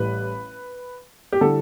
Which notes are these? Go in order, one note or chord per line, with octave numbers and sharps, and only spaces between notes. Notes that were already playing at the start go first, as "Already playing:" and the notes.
Already playing: A1 A2 G3 B4
G4
D3 G3 E4 A4